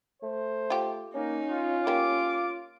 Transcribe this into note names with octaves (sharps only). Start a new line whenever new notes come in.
A3 C5
F4 G4
A#3 C#4 D#4
F4
A#3 G4 D6